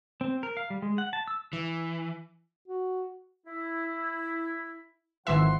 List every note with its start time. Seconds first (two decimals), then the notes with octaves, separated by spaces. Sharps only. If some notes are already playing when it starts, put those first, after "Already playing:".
0.21 C4
0.43 A#4
0.57 F5
0.70 G3
0.82 G#3
0.98 F#5
1.13 A5
1.28 E6
1.53 E3
2.68 F#4
3.47 E4
5.27 G#1 E3 F3 E5 F#5 C6